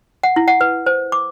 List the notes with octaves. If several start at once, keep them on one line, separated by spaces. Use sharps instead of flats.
F#5
E4
F#5
B4
C5
D6